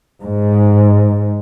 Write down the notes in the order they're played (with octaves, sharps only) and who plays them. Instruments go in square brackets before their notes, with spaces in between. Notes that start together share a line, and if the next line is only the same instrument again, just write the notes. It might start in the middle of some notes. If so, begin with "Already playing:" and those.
[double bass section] G#2